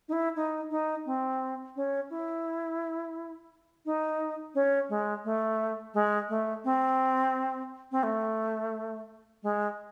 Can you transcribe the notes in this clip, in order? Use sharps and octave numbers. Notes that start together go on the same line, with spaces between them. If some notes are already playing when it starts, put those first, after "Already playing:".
D#4
E4
D#4
D#4
C4
C#4
E4
D#4
C#4
G#3
A3
G#3
A3
C4
C4
A3
G#3